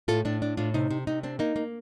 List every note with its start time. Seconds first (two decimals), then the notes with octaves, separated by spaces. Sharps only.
0.08 A2 F4 A4
0.25 A2 D4
0.42 D4
0.57 A2 D4 F4
0.74 C3 D#4
0.90 C3
1.07 C3 D#4
1.23 C4 D4
1.39 A#3 D#4
1.56 A#3